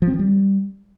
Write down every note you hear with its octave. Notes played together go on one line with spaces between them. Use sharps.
F3
C4
E3
G3